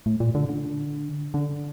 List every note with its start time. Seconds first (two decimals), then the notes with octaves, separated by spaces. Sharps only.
0.06 A2
0.20 A#2
0.35 D3
0.49 D3
1.34 D3